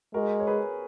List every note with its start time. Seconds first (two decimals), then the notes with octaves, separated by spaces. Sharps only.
0.14 G#3 F#4 A#4
0.40 C#5
0.47 G#4 B4